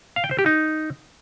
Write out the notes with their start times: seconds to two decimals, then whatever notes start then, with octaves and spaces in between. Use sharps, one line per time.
0.16 F5
0.24 G5
0.31 C5
0.39 G4
0.46 D#4